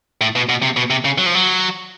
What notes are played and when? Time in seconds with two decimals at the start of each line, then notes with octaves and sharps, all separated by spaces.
0.21 A2
0.36 B2
0.49 B2
0.62 C3
0.77 B2
0.90 C3
1.05 C#3
1.18 F#3
1.26 F3
1.35 F#3